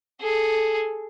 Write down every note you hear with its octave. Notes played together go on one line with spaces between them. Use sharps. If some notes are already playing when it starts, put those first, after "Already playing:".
G#4 A4